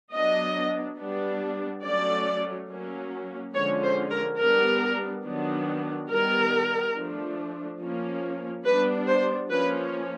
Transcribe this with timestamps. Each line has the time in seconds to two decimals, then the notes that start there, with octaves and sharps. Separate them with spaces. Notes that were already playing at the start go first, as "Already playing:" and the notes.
0.13 F#3 B3 D4 D#5
0.98 G3 B3 D4
1.83 F#3 A3 C#4 D5
2.69 F#3 A#3 C#4
3.53 D3 F3 G#3 C#4 C#5
3.83 C5
4.10 A#4
4.39 G3 B3 D4 A#4
5.24 D#3 F#3 B3 D4
6.09 D#3 G3 B3 A#4
6.94 F3 A3 D4
7.80 F3 A#3 C#4
8.65 G3 B3 D4 B4
9.07 C5
9.50 F3 A#3 C#4 B4